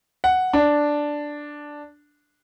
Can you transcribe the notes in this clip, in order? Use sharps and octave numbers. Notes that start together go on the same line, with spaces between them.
F#5
D4